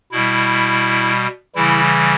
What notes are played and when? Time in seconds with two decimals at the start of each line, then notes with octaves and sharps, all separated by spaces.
0.12 B2 G3 E4
1.56 C#3 E3 G3 E4